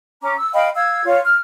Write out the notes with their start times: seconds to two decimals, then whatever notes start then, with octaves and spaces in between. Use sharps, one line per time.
0.21 C#4 A#5 D6
0.35 E6
0.54 D#5 F5 G5 B5
0.75 F5 E6 G#6
1.05 F4 C#5 F5
1.25 F6